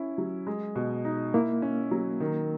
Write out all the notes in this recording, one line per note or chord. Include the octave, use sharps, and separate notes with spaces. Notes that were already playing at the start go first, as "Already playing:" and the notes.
Already playing: C#4 E4
F#3
G#3
B2
D#4
A#3 E4
C#4
F#3
D#3